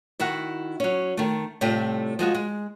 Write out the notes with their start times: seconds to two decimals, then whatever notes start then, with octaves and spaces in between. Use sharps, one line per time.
0.20 D#3 E4 F#4 F#5
0.80 F#3 C#4
1.17 D#3 A3
1.61 A2 C3 G3 A3 F4 G5
2.19 F3 G#3 F#4 G#4
2.35 G#3